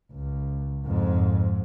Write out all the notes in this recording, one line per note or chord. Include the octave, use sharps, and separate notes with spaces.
C#2
F2 G#2